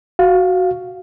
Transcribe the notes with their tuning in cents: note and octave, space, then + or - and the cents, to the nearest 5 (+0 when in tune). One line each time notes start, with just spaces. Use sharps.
F#4 +0 F5 +0